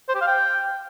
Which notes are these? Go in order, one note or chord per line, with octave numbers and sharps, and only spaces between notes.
C5
G4
F5
G5